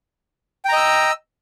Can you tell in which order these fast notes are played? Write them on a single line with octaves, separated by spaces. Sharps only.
G5 A#5 D#5 E6